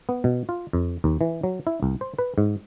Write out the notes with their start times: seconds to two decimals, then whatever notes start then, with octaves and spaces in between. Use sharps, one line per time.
0.09 B3
0.24 B2
0.49 F4
0.73 F2
1.04 D#2
1.21 E3
1.43 F#3
1.67 E4
1.83 C2
2.01 C5
2.18 B4
2.38 G#2